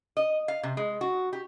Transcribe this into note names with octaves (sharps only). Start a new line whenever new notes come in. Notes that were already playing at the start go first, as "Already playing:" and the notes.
D#5
F5
C3
G#3
F#4
G4